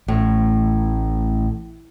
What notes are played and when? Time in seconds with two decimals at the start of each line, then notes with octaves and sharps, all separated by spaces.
0.08 A1 A2